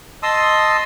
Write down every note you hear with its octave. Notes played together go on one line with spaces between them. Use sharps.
D#5 A5 C6 D#6 E6